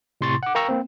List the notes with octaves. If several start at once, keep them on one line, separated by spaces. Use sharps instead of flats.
A2 C3 C6 C#6 A6
F#5 D6
A#4 F5 G5 A#5 C#6 E6
A#3 C4